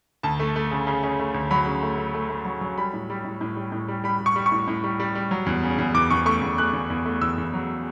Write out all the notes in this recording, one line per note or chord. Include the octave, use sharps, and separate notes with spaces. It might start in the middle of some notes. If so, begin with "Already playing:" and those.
D2 A5
A3
A3
C#3
C#3
C#3
A3
D2
F#3 B5
C#3
A3
A3
A3
A3
F#3
F#3
G3 B5
A2
G3
A2
A2
G3
A2
G3
G3 B5
G3
C#6
G3
C#6
A2
A2
G3
G3
G3
F#3
E2
C#3
E2
E2 D6
E2 C#6
A3 C#6
E2
A3 F#6
E2
E2
A3
E2 E6
E2
F#3